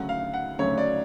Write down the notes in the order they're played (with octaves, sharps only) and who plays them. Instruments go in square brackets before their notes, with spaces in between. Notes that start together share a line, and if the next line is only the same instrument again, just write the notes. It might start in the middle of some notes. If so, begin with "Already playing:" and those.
Already playing: [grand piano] D2 C#3 F#3 A3 F#5
F5
F#5
D2 C#3 F#3 A3 C#5
D5